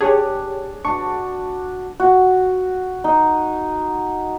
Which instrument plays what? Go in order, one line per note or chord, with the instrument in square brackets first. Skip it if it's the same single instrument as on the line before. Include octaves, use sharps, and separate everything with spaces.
[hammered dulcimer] D4 [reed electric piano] G4 [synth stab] G#4 C#5
[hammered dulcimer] D4 F#4 [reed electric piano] C#6
[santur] F#4
D#4